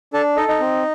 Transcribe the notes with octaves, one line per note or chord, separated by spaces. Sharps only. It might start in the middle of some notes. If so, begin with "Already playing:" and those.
D4 A4 A5
D#4 A4 D#5
D#4 D#5
C4